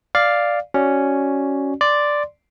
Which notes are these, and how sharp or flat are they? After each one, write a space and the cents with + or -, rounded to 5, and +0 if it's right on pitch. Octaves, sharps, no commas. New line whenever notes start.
D5 +0 F5 +0
C#4 +0 F#4 +10 D5 +0
D5 +0 C6 -5